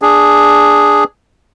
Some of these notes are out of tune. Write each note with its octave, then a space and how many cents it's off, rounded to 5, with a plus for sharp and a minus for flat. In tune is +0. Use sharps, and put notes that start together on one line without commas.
D4 +0 G#4 +0